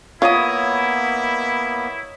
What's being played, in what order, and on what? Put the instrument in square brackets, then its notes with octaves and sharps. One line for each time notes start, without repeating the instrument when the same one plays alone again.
[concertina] A#3 B3 [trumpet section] E4 [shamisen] F4 [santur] C#5 D#5 D#6